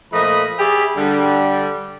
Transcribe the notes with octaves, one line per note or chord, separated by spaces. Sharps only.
A#2 F3 A3 D#5 B5
G4 G#4 D5 E5 B5
D3 G3